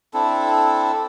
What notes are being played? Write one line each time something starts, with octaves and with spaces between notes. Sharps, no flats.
C4 D4 E4 A4